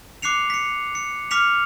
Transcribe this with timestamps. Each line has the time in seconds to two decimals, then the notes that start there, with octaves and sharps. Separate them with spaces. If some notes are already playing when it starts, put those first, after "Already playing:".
0.22 D6 F#6 C7 C#7 F7
0.50 B6 C#7
0.95 C#7
1.31 D6 F6 B6 C#7 F7